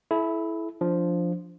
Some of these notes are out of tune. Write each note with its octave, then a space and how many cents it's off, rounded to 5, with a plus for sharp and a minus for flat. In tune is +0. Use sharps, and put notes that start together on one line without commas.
E4 +0 A4 -40
F3 +0 D4 +0